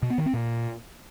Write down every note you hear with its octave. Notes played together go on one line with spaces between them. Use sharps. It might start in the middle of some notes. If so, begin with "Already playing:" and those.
B2
B3
D#3
C4
A#2